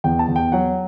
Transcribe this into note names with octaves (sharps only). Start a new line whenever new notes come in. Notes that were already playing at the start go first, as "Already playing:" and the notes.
E2 G5
A5
E2
G5
F#3 F#5